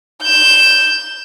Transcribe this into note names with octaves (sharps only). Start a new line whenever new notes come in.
G6 E7